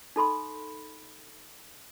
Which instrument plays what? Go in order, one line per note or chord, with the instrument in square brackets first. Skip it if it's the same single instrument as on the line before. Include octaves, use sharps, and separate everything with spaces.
[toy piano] D#4 A4 B5 C6